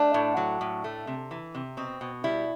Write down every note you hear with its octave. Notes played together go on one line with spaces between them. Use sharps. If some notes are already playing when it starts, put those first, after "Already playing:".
Already playing: A3 D4
A2
F#3
A2
A3
C3
E3
C3
B2 C4
B2
G3 E4